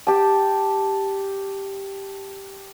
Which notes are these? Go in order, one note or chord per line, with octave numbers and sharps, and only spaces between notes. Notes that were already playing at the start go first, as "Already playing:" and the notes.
G4 A5